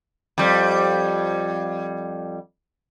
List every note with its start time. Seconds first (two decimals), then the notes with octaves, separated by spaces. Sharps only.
0.38 F2 G3